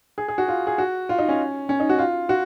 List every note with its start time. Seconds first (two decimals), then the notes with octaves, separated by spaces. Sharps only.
0.18 G#4
0.28 G#4
0.38 F#4
0.48 F4
0.67 G#4
0.78 F#4
1.09 F4
1.19 D#4
1.29 C#4
1.69 C#4
1.80 D#4
1.89 F#4
1.99 F4
2.29 F#4